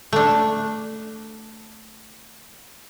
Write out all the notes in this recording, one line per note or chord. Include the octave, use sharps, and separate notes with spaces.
A3 D4